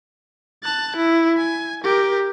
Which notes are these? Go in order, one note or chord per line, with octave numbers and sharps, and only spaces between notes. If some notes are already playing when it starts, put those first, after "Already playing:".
A5 F#6
E4
G#5
G4 A#4